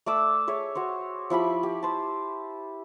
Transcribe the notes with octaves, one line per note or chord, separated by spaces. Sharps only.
A3 D5 D6 E6
G#4 C#5 E5
F#4 C5 C#5
F3 E4 G4 B5
G4
C5 A5